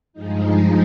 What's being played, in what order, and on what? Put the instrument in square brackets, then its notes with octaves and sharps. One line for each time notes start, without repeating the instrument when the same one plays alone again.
[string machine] G2 F3 G#3 D#4